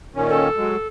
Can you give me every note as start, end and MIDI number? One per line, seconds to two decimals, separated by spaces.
0.15 0.49 46
0.15 0.49 51
0.15 0.49 61
0.29 0.87 69
0.57 0.76 54
0.57 0.76 56